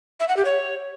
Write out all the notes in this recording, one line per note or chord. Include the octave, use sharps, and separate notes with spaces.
E5
F#5
G4
C#5